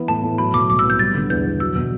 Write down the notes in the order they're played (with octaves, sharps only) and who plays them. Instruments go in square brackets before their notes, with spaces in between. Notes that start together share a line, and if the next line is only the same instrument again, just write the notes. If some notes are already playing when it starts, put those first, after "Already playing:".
Already playing: [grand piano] E3 B3
[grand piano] A2 [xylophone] A5
[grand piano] A2
[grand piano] F#3 [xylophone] B5
[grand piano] B2 [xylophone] D6
[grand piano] C2 [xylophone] D6
[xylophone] E6
[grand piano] B3
[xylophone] G6
[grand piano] G3 [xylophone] A6
[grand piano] D3
[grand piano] E2 [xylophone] G6
[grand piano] E2
[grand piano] F#3 [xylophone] E6
[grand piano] B2